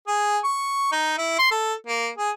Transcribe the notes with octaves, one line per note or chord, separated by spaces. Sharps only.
G#4
C#6
D#4
E4
C6
A4
A#3
G#4